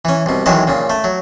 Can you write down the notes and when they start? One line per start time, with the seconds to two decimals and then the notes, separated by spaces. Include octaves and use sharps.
0.05 E3 C#4
0.26 C2 B2
0.46 B1 D#3 E3 F#3 G#3 A5
0.67 A#2 C#3
0.90 A3
1.04 F#3